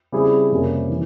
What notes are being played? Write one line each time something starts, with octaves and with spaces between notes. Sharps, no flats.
C#3 G3 C4 E4 G#4
F2 C3 G3 A#3 C#4
E3